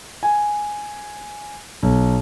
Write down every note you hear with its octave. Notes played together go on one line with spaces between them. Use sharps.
G#5
B1